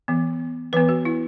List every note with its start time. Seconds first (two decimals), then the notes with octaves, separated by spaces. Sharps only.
0.08 E3 B3
0.73 E3 B3 B4
0.89 F#4
1.05 E4